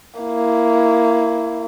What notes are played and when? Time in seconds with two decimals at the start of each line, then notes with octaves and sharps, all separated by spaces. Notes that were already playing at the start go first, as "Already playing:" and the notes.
0.20 A#3 E4